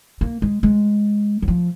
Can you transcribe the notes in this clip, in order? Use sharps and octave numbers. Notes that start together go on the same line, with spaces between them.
A#3
G#3
G#3
F#3
F3